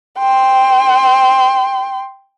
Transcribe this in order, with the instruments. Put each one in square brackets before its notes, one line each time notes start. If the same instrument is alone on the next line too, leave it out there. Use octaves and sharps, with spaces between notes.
[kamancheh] G5 C6